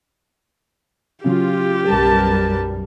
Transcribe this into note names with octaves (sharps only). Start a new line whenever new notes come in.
C#3 F#3 F4 G4
B1 F#2 G3 A#4 B4 A5